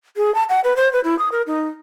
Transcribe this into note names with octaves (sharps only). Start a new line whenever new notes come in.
G#4
A5
F#5
B4
C5
B4
E4
D#6
A#4
D#4